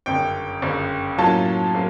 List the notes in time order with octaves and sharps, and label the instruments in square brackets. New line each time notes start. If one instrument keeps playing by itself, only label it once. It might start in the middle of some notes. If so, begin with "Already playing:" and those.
[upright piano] G1 F#2 C#3 G5
G1 F#2 C#3
A2 F#3 A#3 C#4 F4 A5
F#3 A#3